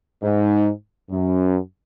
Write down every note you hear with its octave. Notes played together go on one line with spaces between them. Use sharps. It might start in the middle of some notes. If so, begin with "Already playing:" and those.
G#2
F#2